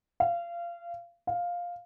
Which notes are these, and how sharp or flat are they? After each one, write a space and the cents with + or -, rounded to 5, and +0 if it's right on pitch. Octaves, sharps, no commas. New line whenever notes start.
F5 -25
F5 +5